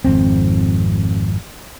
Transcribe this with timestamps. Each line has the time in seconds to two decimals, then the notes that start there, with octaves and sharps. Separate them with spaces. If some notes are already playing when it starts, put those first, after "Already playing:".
0.05 G#1 F2 C4